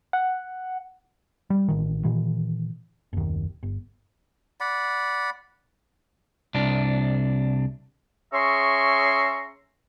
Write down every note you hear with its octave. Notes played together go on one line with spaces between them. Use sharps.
F#5
G3
A1 D#3
A#2 D#3 E3
F#1 D#2
G1
D5 F#5 B5
C2 D4
C#4 G#4 E5 A#5 C6 C#6